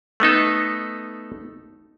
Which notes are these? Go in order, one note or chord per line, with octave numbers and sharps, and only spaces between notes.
A3 B3 D#4 A4